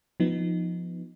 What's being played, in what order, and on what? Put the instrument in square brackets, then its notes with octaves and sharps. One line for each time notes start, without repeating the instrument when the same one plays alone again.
[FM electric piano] F3 B3 D#4